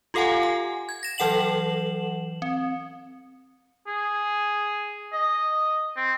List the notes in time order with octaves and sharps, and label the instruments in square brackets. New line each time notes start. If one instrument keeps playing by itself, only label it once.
[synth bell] F4 G4 A4 F5 F#5 G#5
G#5
G#6
A#6 E7
E3 F#3 A4 F#5 E7 F#7
C4
[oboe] G#4
D#5
C4